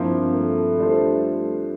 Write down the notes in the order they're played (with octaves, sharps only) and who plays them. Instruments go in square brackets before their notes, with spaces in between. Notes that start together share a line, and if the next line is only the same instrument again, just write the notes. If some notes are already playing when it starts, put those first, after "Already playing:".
Already playing: [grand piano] G2 F3 C4 E4 [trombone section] A#3
[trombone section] A3
[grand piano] G3 D4 F4 A4 C5